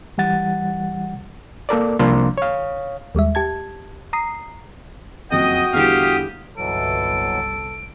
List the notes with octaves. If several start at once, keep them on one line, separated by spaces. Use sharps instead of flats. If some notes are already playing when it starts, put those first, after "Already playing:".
E3 G3 F#5 A6
A#3 A4 A#4 D5
C2 F3 A#3 D4 F5 C6
C#5 F5
D#2 G3 G#3 E5
G4 A5 G#6
A#5 D#6 C7
F#1 F2 F#4 D#5 F#5 G5 D#6
E2 D3 G3 E4 G4 F5
G1 C2 B2 E3 F#3 A4 D7